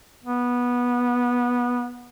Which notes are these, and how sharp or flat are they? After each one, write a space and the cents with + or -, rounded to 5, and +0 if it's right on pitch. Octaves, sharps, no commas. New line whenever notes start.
B3 -15